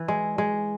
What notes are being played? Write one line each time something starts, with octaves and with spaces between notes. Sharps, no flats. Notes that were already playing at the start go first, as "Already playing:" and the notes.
Already playing: E3
G#3
G#3